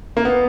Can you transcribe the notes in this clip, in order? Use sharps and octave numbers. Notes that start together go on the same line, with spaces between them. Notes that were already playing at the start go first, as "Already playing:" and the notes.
A#3
B3